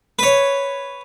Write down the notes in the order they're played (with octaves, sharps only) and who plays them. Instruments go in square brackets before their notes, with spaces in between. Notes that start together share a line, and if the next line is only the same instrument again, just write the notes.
[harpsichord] B4 C#5